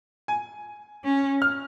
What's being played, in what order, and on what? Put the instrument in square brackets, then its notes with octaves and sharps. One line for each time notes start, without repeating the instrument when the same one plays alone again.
[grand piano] G#5
[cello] C#4
[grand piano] F6